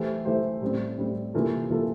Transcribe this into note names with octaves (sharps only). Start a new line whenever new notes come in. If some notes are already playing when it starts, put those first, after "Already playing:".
Already playing: E3 A3 E4 G4 C5
E3 A3 E4 G4 C5
A2 G3 C4
A2 G3 C4
C3 E3 A#3 F4 A4
C3 E3 A#3 F4 A4